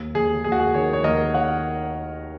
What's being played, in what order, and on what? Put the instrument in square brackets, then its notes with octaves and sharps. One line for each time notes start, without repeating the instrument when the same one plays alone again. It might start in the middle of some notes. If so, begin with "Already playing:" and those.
Already playing: [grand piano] D#2
[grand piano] D#2 [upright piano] G#4
[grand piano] D#2 [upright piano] G#4
[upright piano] F#4
G#4
[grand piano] D#3 [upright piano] G#4 C#5
[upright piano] C#5
[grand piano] D#2 [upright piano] A#4 D#5
[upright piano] C#5 F#5